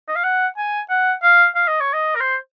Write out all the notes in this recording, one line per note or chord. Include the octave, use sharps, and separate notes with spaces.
D#5
F5
F#5
G#5
F#5
F5
F5
D#5
C#5
D#5
A#4
C5